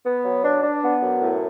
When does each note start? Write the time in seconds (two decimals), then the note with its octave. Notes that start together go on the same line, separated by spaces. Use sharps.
0.06 B3
0.25 F#3
0.44 D4
0.63 D4
0.83 B3
1.02 F#2
1.22 A2